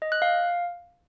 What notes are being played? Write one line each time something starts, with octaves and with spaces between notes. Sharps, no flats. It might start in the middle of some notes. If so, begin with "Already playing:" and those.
D#5
F#6
F5